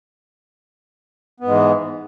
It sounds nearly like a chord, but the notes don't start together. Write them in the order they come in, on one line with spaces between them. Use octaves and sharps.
B3 G#2 G#3 E3